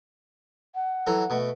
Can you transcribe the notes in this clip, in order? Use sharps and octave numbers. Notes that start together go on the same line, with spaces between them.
F#5
E3 F#3 A4
B2 A3